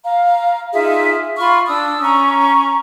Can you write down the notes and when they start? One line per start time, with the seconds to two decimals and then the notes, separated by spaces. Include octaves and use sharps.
0.04 F5 A#5
0.73 D#4 F4 G#4 E5
1.38 F4 B5 C#6 F6
1.68 D4 D#6 E6
2.02 C#4 A#5 C#6